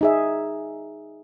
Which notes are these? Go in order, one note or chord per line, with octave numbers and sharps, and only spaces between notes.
D#4 G#4 E5